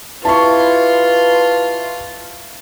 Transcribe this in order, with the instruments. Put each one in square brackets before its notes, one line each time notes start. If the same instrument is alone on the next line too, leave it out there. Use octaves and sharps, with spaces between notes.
[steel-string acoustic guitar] E4 G4 [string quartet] F4 [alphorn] B4 [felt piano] A5 C#6